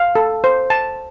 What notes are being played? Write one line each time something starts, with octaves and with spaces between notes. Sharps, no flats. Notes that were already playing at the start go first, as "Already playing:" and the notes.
Already playing: F5
A4
C5
A5